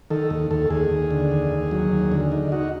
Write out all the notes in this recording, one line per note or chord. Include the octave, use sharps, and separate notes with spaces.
D#3 A4
D#2
D#2 A4
D#2 G#4
D#2
D3
D#2
D#2
F#3
D#2
D3
D#4
D#4 F#4